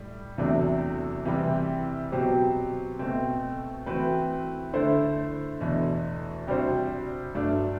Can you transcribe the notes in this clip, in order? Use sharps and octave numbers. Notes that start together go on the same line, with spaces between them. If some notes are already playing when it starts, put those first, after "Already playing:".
Already playing: A2 G3
E2 C3 F#3 A3 D4
C3 E3 G3 C4
B2 F#3 C4 G4 C5
B2 A3 C4
E3 A3 C4 F#4 B4
D3 A3 E4 A4 C5
E2 B2 A3 D4
C3 G3 D4 F#4 C5
G2 F#3 A3 D4